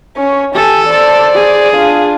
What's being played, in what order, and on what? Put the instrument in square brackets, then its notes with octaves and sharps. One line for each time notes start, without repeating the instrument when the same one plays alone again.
[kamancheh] C#4 C#5
[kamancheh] G4 G#5 [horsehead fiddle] A4 A5
[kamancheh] C5 D5
[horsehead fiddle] G#4
[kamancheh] D4 F4